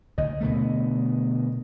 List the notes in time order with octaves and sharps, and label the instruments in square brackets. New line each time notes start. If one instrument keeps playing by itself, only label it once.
[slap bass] D2 [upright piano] D#5
[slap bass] B2 D3 A3